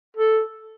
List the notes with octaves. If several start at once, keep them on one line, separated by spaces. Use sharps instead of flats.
A4